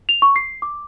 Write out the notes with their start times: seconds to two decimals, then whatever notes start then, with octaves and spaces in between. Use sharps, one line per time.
0.09 F7
0.22 C#6
0.36 C7
0.62 D6